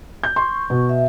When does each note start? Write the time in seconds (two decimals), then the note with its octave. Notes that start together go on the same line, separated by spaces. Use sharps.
0.23 G6
0.36 C6 C#6
0.70 B2
0.89 E5